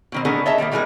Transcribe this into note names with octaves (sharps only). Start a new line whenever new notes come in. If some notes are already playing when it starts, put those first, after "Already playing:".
B2 D#3 C4
D3 A3 B3 D#4 G#4 A#4
C#5 D#5 E5 A5 A#5
D#3 G3 A3 A#3
E3 G3 G#3 D#4 G#4 A#4